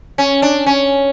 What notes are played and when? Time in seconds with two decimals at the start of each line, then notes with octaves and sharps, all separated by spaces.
0.18 C#4
0.42 D4
0.66 C#4